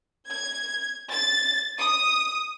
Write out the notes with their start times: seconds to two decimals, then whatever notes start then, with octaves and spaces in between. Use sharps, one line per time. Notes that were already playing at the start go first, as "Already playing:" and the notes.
0.29 G#6
1.11 A6
1.79 D#6